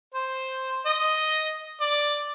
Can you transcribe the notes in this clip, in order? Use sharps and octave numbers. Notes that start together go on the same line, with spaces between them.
C5
D#5
D5